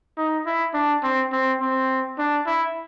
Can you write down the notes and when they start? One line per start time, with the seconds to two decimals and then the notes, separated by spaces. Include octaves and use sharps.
0.18 D#4
0.46 E4
0.74 D4
1.03 C4
1.32 C4
1.61 C4
2.19 D4
2.46 E4